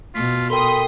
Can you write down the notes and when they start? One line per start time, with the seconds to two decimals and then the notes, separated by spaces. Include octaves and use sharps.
0.15 B2 F4 B6
0.50 A4 A#4 G5 B5 C6 D#6